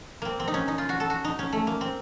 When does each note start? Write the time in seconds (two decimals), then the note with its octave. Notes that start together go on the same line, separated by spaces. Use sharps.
0.22 A#3 C4
0.39 C4
0.48 D#4
0.54 C#4
0.68 D#4
0.78 F4
0.89 F#4
1.00 A4
1.10 F#4
1.24 D#4
1.39 C#4
1.53 A3
1.67 A#3
1.81 C4